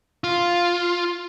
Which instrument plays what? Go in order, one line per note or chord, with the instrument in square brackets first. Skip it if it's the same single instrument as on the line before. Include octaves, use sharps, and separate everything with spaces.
[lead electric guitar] F4